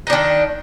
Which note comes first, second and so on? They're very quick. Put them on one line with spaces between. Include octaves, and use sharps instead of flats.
D#4 D4 D#3